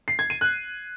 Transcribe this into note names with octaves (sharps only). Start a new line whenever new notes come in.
C7
G#6
D#7
F#6